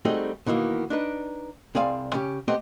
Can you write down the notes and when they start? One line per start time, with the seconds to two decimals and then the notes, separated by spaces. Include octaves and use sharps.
0.05 G3 A3 C4 D#4 F#4 G#4
0.46 B2 D#3 E3 A#3 B3
0.90 D4 D#4 B4
1.75 C2 C4 G#4 D5 F5 G#5
2.13 C#3 C#4 G4
2.48 A3 B3 C4 G4 C5 D#5